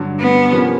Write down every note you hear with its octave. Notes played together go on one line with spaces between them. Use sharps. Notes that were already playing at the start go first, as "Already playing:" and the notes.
Already playing: G2 D3 F#3
B3
C3 F3 A#3 C#4